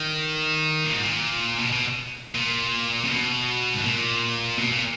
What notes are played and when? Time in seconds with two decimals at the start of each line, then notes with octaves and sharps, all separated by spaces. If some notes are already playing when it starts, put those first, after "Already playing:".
Already playing: D#3
0.85 A#2
0.94 G#2
1.03 A#2
1.60 B2
1.73 B2
2.35 A#2
3.04 C#3
3.09 B2
3.74 G#2
3.84 A#2
4.58 B2
4.72 A#2